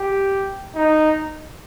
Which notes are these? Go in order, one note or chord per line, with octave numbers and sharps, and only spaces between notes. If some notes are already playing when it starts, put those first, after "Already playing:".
Already playing: G4
D#4